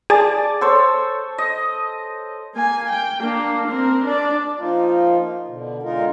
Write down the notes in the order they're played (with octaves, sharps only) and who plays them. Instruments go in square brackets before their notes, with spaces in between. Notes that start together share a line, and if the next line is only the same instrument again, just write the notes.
[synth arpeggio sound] G#4 A5 [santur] D5
[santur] A4 C5 C#5
D#5
[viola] A#3 G#5
G5
A#3 D4
C4 A#4
D4 D5
[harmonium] F3 A#3 D#4 F4
B2 D3
D3 G#3 D#4 F4 A#4